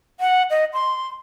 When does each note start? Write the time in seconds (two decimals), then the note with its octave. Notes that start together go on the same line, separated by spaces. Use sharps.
0.20 F#5
0.50 D#5
0.74 C6